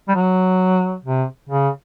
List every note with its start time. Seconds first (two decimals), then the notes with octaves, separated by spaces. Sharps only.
0.08 G3
0.15 F#3
1.04 C3
1.49 C#3